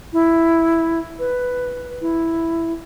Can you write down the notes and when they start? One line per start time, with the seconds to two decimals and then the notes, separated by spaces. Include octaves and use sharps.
0.13 E4
1.19 B4
2.01 E4